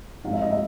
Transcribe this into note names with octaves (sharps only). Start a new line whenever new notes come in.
G#2 F3 G#3 C4 D#4 F5
E5
D#5
E5